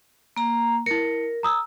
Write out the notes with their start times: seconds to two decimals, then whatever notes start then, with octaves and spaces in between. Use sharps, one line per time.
0.37 A#3 A#5
0.86 E4 A#4 C#7
1.43 A#5 D#6 E6